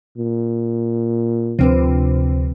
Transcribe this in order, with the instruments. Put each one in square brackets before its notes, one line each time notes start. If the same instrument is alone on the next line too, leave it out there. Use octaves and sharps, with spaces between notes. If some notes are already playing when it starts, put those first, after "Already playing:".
[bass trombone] A#2
[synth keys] D2 C3 [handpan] F3 C4 B4